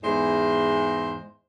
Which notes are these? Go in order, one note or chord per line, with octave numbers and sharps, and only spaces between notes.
E2 G#2 G#3 E4 C5